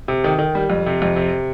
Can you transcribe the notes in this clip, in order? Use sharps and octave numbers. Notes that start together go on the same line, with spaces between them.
C3
D#3
D#3
G3
F2
C3
F2
C3